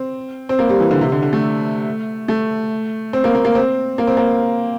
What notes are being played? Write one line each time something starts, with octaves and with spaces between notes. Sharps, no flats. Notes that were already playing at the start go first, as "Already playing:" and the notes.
Already playing: C4
C4
A#3
G3
E3
D3
C3
D3
D3
A3
A3
C4
A#3
A#3
A#3
C4
A#3
C4
A#3